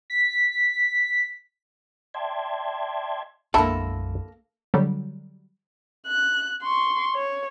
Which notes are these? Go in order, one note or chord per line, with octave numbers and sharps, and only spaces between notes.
B6
D5 E5 G5 A5 C6 G#6
B1 F#2 D3 G#3 A#3 E4 A4 A5
D3 F#3 G3
F#6
C6 C#6
C#5